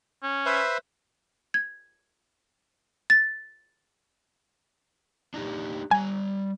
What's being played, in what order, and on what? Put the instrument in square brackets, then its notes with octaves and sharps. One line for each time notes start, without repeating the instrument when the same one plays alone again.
[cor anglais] C#4
[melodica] B4 C5 E5
[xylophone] G#6
A6
[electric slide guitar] D4 D#4 G4
[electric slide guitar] G3 A#5 [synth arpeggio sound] G#5